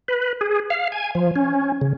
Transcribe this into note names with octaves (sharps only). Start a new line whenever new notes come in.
B4
G#4
F5
G#5
F3
C#4
C#3